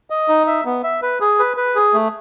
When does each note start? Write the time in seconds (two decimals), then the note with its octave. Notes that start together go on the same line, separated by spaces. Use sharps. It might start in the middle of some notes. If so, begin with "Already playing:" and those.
0.10 D#5
0.28 D#4
0.47 E5
0.65 B3
0.84 E5
1.02 B4
1.21 G#4
1.39 B4
1.57 B4
1.76 G#4
1.94 A3